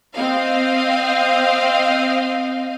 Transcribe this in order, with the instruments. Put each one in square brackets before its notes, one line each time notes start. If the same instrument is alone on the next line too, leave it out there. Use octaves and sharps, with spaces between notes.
[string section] C4 D#5 F5